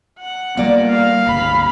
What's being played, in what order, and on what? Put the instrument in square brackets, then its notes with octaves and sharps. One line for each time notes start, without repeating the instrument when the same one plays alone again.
[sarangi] F#5
[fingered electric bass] G3 G#3 B3 [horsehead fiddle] A#3 [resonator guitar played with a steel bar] F4 D5
[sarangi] F5
[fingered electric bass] G1 C#2 [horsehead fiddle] B5